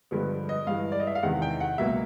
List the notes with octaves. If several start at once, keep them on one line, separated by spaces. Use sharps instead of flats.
G2 D3 F3 G#3 B3
D#5
G2 E3 G#3 F5
D5
D#5
E5
F5
E2 C3 D#3 G#3 F#5
G5
F#5
C#2 B2 F#3 A#3 E5